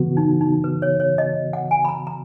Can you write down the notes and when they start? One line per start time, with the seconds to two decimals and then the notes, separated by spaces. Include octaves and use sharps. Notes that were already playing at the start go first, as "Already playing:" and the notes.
Already playing: C#3 E3 B3 F#4
0.17 D#4
0.41 D#4
0.64 B4
0.82 C#5
1.00 C#5
1.18 D#5
1.53 F#5
1.71 G#5
1.85 B5
1.89 A#5
2.07 A#5